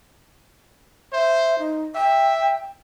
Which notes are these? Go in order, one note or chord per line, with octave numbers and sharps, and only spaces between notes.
C5 E5
D#4
E5 G5